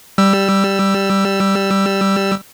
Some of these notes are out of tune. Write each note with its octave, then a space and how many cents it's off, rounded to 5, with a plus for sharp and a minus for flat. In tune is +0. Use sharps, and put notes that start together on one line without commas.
G3 +0 E6 +15